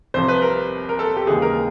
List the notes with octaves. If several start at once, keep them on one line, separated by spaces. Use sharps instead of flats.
C2 C3 F3 C5
B4
A#4
A#4
A4
G4
D#2 C#3 E3 G#3 G#4
A#4